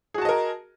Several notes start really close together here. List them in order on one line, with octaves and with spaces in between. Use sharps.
G#4 F#4 A5 D#5 A#4